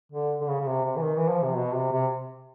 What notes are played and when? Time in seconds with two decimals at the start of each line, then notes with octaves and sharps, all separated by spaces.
0.12 D3
0.40 D3
0.48 C#3
0.60 C#3
0.66 C3
0.84 C3
0.96 E3
1.02 D#3
1.16 E3
1.29 F3
1.43 C3
1.57 B2
1.75 C3
1.92 C3